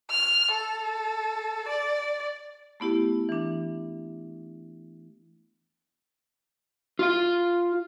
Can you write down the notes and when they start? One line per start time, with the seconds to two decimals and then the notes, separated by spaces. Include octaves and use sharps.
0.11 F6
0.52 A4
1.68 D5
2.80 A3 B3 E4 G4
3.29 E3 D4
6.99 F4 F5